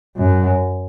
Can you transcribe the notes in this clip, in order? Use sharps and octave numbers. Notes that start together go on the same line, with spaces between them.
F#2